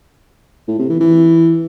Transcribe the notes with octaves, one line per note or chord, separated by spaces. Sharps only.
A2
C3
E3
E3